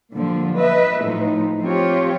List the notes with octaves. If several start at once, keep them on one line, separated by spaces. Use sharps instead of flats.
A#2 D3 F3 G3
B4 D#5 E5
A2 F3 D#4
F3 C4 F4 G4 C#5